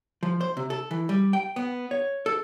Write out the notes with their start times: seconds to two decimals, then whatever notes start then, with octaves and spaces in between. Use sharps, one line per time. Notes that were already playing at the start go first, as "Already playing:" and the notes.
0.23 F3
0.41 C5
0.57 C3
0.70 A4
0.91 E3
1.09 G3
1.33 G5
1.56 B3
1.91 C#5
2.26 A4